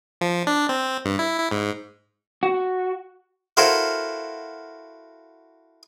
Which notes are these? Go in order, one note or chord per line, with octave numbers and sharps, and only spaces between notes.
F3
D4
C4
G2
E4
E4
G#2
F#4
E4 F#4 A4 A#4 C5 F5